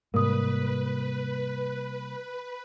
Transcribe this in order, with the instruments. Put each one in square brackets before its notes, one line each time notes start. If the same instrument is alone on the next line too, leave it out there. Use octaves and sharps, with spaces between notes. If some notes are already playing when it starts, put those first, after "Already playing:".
[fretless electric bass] G#2 G#3 [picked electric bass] C3 G3 A#3 [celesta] A#4 D#6 [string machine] B4